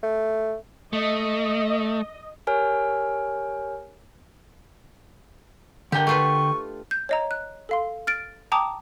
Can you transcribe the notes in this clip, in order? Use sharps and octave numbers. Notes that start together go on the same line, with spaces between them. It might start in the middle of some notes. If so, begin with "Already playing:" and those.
A3
A3 D#5
G4 A#4 C#5 G#5 F6
D3 A#3 D4 G4 G5
A3 F4 B4 C#6
G6
C#5 D#5 A#5
F#6
A4 F5 C6
F6 A6 D7
G5 A5 A#5 D6 D#6